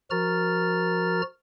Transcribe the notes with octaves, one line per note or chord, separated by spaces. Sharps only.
F3 F#4 A#4 A#5 F6 A6